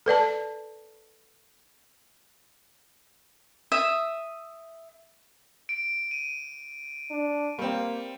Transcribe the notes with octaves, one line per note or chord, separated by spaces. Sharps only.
A4 B4 D5 A5
E5 D#6
D7
D#7
D4
G3 A#3 C4